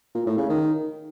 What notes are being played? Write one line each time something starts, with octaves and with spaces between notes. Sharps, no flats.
A#2
A2
C#3
D#3